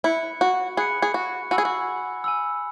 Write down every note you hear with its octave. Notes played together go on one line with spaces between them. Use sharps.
E4 B5 F#6 C#7
F#4
G#4 B5 F#6 C#7
G#4
F#4
F#4 G#5 B5 E6
G#4
F#4
G#5 B5 E6